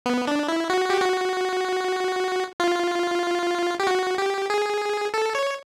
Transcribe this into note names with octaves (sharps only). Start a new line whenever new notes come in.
B3
D4
E4
F#4
G4
F#4
F4
G4
F#4
G4
G#4
A4
C#5